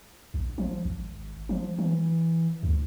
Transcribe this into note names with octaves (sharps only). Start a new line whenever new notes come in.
A#1
F3
G#1
F3
E3
D2